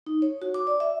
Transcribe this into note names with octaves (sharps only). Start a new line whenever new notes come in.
D#4
C#5
F#4
D6
D5
E5